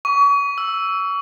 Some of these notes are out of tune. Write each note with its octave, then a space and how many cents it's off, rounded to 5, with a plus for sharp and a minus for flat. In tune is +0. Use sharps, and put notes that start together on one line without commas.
C#6 +35
E6 +0